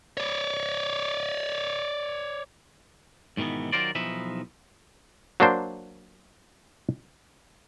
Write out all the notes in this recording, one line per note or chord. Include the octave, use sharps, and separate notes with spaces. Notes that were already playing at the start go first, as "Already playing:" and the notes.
C#5 D5
G#2 B2 D#3 E3 B3
D#3 F#3 F4 A#4 C5 D5
B1 E3 F3 D#4 B4 E5
F#3 A#3 D4 C5